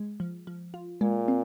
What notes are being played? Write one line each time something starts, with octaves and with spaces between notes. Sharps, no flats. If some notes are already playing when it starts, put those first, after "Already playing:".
Already playing: G#3
F3
F3
F4
A#2 G#3
C4